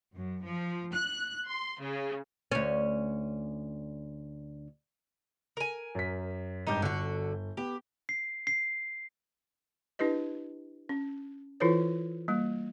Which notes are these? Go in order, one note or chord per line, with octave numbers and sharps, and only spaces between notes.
F#2
F3
F#6
C6
C#3
D2 C#4
A#4 G#5
F#2 B6
G#1 G2 D#4 G4 G6
G1 D3 F#4
B3 G4
C7
C7
D4 E4 G4 B4 D#5
C#4
E3 E4 F4 A4 B4 C#5
G3 A#3